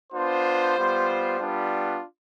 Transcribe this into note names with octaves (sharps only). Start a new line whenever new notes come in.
B3 D4 F4 C5
G3 B3 F4
G3 B3 D4 F4